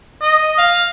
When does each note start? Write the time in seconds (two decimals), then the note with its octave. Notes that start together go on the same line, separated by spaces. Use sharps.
0.22 D#5
0.58 F5